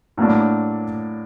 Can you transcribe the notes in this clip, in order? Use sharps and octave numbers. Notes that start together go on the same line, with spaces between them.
A2 F#3 A#3 D4